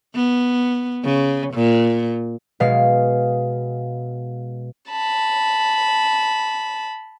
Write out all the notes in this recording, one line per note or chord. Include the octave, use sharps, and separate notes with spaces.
B3
C#3
A#2
B2 G#3 F5
A5 B5